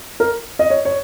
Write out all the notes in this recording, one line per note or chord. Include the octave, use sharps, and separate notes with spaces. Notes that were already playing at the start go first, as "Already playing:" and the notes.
A#4
D#5
C#5
C#5